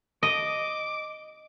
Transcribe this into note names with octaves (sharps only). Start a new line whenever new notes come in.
D#5 D6